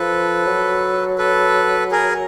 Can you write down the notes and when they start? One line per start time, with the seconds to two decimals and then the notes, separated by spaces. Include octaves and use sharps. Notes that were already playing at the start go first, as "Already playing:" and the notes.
Already playing: F3 A4 B4
0.46 F#3
1.18 A4 B4
1.91 G#4 A#4